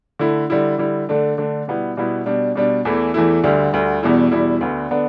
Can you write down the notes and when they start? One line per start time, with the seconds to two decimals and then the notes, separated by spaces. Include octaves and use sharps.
0.19 D3 A3 E4
0.50 D3 G3 E4
0.78 D3 G3 E4
1.09 D3 A3 D4
1.38 D3 A3 D4
1.68 B2 G3 B3 E4
1.97 B2 G3 B3 E4
2.26 B2 G3 D4
2.55 B2 G3 D4
2.85 E2 E3 A3 E4
3.14 E2 E3 A3 E4
3.44 D2 D3 G3
3.73 D2 D3 G3
4.03 E2 B2 G3 E4
4.32 E2 B2 G3 E4
4.61 D2 D3 B3 D4
4.91 D3 B3 D4